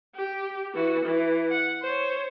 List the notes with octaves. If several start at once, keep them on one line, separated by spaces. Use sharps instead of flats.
G4
E3 F#4
E3
F#5
C5 C#5